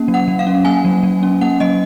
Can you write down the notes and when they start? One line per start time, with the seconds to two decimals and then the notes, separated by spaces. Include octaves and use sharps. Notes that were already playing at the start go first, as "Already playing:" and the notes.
Already playing: A#3 C#4
0.08 F#3
0.14 F#5
0.28 F#3
0.39 F5
0.47 C#4
0.65 A#3 G#5
0.84 F#3
1.03 F#3
1.23 C#4
1.41 A#3 F#5
1.60 F#3 D#5